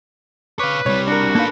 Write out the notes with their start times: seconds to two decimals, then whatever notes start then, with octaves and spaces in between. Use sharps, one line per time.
0.59 B4 C#5 F5 D6
0.86 C2 G3 C#5
1.08 D4 F#4 A#4
1.35 A#3 D#4 A4 B4 F5